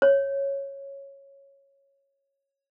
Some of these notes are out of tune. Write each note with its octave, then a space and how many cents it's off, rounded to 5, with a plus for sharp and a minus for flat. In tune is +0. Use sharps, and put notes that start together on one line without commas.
C#5 -10